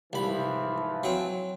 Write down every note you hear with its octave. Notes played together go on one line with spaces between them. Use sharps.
C2 G#2 E3 F3 B5
F#3 C4